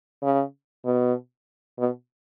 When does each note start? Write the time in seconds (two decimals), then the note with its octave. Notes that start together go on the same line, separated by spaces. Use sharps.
0.23 C#3
0.85 B2
1.79 B2